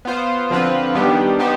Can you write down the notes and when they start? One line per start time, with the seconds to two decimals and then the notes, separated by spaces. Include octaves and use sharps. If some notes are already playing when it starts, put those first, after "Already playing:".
0.05 B3 F4 C5
0.50 D3 F3 C4 F4 B4
0.95 D#3 G3 B3 D4 G4
1.39 B3 D#4 G4 C5